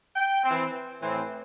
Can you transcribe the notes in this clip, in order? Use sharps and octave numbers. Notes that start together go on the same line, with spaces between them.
G5
E3 C4
A2 E3 C4